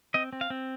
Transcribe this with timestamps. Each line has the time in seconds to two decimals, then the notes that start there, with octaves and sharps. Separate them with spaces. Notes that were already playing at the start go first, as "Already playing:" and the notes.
0.14 C4 D#5
0.33 C4
0.41 F5
0.50 C4